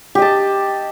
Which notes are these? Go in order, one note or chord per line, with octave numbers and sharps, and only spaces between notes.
G4 D#5 A5